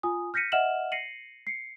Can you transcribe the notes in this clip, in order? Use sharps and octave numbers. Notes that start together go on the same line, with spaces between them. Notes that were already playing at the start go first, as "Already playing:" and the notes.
F4 G#5 D#6
F6 G6 A#6 B6 C#7 D#7
D#5 E5 F#5 F6 E7 F#7
A#6 C7 C#7 D#7 F#7
C7 C#7